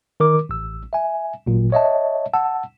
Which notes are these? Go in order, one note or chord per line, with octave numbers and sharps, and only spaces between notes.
D#3 A#4 D6
A1 E6
E5 G#5
G#1 A#2 F#3
C#5 D#5 E5 A5
F#5 A5 E6